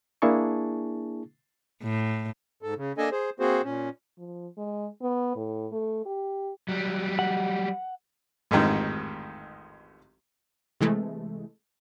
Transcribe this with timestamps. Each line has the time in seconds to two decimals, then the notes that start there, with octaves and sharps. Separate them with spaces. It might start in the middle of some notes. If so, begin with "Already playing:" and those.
0.22 A#3 D4 E4 G#4 A5 C#6
1.83 A2
2.63 G#2 A4
2.77 C#3
2.98 A#3 D4 A4 D#5 G#5
3.12 G#4 C5
3.40 A#3 C4 F#4 G#4 C5
3.64 A#2 C#4
4.18 F3
4.58 G#3
5.02 B3
5.36 A2
5.72 A3
6.06 G4
6.69 F#3 G3
7.19 F#5
8.51 A1 F2 G#2 D#3
10.81 C3 E3 G#3 A3